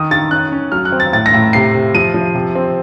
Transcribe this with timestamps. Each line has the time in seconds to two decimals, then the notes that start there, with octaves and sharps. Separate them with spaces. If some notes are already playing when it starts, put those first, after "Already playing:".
Already playing: D#3 D#6
0.11 D#3 A6
0.31 C#4 F#6
0.52 C#4
0.72 F#3 F6
0.85 F#6
0.92 C4
1.00 A6
1.12 A2 A6
1.26 A#6
1.34 A2
1.53 C3 C7
1.74 C3
1.95 F3 D#7
2.14 F3
2.35 C3
2.55 C4